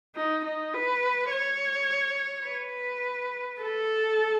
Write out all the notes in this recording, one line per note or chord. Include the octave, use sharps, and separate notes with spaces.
D#4
D#4
B4
C#5
B4
A4